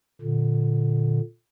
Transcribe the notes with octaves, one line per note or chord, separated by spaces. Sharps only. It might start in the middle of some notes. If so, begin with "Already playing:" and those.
A#2 D3